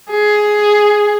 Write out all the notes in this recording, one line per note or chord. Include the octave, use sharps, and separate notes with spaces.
G#4